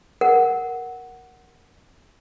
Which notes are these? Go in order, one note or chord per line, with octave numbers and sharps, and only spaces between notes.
A#4 F#5